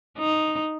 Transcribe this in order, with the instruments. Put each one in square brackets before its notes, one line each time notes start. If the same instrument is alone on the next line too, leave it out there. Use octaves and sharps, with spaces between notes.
[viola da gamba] D#4